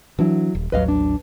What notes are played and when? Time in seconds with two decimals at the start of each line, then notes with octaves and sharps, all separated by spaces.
0.19 E3 F#3 D4 E4
0.55 D#1
0.72 A1 D#2 F#3 B4 D#5 F5
0.88 D4